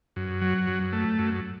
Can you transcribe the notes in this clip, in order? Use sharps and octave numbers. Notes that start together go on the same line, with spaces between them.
F#2
F#3
F#2
A3
F#2